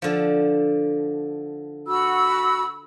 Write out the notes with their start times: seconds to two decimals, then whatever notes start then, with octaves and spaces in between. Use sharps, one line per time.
0.02 D3 F3
1.87 F#4 B5 E6